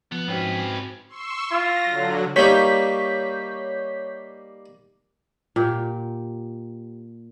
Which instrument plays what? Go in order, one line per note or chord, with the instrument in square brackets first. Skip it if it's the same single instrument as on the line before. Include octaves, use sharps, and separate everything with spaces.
[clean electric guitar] F3 [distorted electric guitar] B3
[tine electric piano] G#2 C4 F#4 [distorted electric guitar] C#4 B4
[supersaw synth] C6 C#6 E6
[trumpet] F4 [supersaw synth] A#6
[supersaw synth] D3 F#3
[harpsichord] G3 A#3 D#4 [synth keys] C#5 G6 B6
[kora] A#2 G4